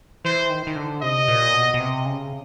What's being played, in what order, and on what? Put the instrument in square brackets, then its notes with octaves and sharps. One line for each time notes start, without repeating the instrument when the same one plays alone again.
[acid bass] E3 [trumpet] C5
[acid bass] D#3
D#3
D3
[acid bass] C3 [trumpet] D#5
[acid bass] A#2
B2
B2
C3
C#3